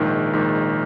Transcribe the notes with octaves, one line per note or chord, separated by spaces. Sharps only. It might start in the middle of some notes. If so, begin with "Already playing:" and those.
Already playing: A#1 G#2 D#3
A#1 G#2 D#3